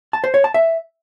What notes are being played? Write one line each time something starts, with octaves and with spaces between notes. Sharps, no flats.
A5
C5
C#5
A5
E5